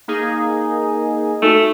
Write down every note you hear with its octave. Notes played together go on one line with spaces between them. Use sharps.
A#3 D#4 G#4
A3 D#4 F#4